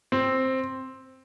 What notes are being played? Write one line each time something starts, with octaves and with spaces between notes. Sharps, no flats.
C4